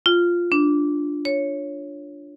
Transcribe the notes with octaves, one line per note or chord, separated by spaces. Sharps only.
F4
D4
C#5